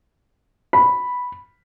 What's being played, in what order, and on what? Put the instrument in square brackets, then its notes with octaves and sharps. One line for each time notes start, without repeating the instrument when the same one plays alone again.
[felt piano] B5